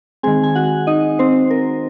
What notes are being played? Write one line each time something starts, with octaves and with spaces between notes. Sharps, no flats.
D#3 G#3 C4 G#4 G#5
G#5
F#4 F#5
D#4 D#5
C4 C5
A#4